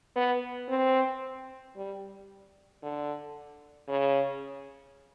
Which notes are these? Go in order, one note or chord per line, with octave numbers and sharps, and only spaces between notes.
B3
C4
G3
D3
C#3